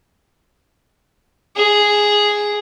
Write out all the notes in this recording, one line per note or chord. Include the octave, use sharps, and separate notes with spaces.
G#4